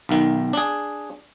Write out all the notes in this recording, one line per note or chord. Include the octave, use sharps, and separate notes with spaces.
B1 D#3
D4 G#4